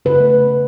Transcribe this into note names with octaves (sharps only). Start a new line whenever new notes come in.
C#3 B4
A3
A3
A3